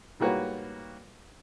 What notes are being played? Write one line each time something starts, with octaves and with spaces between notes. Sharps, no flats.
G#2 G3 A#3 F#4 B4 C#5